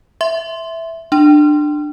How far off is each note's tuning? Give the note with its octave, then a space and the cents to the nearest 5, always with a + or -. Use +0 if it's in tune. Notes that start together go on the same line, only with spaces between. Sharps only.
E5 +0 C6 +0
D4 +20 C6 +0